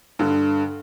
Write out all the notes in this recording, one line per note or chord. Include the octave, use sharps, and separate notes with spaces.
G2 D3